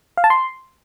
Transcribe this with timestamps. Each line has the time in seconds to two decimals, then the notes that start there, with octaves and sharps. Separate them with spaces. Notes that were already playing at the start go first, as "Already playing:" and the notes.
0.17 F5
0.24 A5
0.30 C6